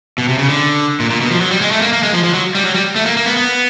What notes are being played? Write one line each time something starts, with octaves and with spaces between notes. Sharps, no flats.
B2
C3
C#3
D3
A#2
A#2
B2
F3
F#3
G3
G#3
A3
A#3
A#3
G#3
F3
F3
F#3
G3
F#3
G3
A3
A#3
A#3
B3
B3